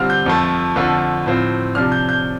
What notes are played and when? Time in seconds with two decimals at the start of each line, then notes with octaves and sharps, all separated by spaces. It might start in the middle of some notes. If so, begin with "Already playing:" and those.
Already playing: D3 G3 C4 F4 F6
0.10 G6
0.26 F2 F3 A3
0.76 F2 D3 F3 A3 F4
1.26 A2 F3 C4 F4
1.75 C3 F3 D4 F6
1.92 G6
2.09 G6